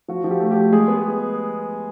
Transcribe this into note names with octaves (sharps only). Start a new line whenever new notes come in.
F3 F#4
F3
G4
A3
A3 G4
G#3 G#4
B3